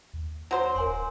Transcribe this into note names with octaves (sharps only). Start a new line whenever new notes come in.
D#2
F#3 C5
D#1 A#4 G#5 C6